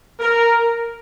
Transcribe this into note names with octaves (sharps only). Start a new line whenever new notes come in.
A#4